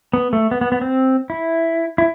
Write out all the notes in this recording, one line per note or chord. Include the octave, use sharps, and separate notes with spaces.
B3
A3
B3
B3
B3
C4
E4
E4